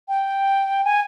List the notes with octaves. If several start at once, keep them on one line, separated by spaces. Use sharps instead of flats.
G5
G#5